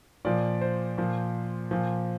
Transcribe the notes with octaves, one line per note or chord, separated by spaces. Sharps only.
A#2 F3 D5
C5
A#2 F3
A#2 F3